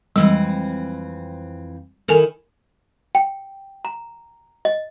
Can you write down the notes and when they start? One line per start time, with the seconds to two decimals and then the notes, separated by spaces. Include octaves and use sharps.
0.16 F2 E3 G3 G#3 C4
2.08 D#3 E4 A4 A#4 G#5
3.15 G5
3.85 A#5
4.65 D#5